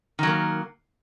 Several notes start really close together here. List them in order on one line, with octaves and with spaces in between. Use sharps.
D#3 F#3 A#3